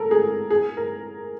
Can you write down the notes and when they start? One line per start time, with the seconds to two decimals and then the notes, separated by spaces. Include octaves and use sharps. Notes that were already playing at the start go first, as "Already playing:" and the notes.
Already playing: A4 A#4
0.11 G#4
0.50 G#4
0.77 A#4